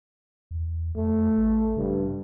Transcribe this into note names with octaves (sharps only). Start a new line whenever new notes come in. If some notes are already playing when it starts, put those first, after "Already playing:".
E2
F2 A3
A1
G2 C#3